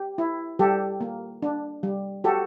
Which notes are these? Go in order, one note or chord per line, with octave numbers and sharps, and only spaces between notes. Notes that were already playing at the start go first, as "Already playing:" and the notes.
Already playing: G4
E4
G3 G4 A4
A#3
D4
G3
F#4 G4 A4